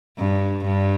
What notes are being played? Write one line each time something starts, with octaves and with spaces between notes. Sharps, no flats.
G2
G2